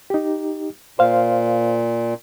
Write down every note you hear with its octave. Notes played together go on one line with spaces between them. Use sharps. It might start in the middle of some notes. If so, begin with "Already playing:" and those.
D#4 G4
A#2 C5 F5